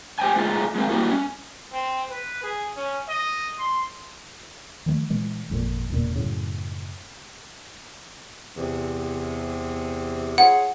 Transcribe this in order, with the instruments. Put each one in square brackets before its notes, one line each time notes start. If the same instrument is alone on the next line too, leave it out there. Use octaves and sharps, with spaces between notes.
[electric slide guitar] G4 C5 G5 G#5
G#3 A3 D#4 F4 G#4
G#3 C4
G3 A3 A#3 E4 F#4 A4
C#4
[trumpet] C4
B4
G#4
C#4
D#5
C6
[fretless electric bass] D#3 F3 G#3 A3
A#2 E3 G#3
G#1 F2 A#2
E1 C#2 A#2
F#2 A2 C#3
[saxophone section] E2 C3
[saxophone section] F4 G#4 C#5 [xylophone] F#5